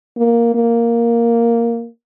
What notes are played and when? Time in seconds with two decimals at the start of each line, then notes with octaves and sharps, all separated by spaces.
0.17 A#3
0.55 A#3